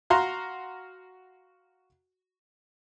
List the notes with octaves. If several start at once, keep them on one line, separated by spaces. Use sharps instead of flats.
F#4 F5 A#5 C6